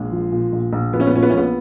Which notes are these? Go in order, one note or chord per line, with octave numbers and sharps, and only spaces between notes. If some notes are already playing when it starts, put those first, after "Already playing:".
Already playing: A#1 G#3
F3
A#2
A#1
A#1
F3 B3
C#4
B3
A#2 C#4
B3
C#4
A#1 B3